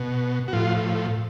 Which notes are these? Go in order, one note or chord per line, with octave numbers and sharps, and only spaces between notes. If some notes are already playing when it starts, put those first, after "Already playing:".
Already playing: B2
F#4
A2 F3 F4